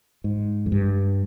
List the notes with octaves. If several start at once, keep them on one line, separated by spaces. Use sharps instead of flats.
G#2
F2
G2